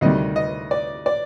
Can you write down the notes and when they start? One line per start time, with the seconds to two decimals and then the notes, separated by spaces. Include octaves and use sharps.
0.01 D2 C3 D#3 G3 D#5
0.36 D#5
0.71 D5
1.06 D5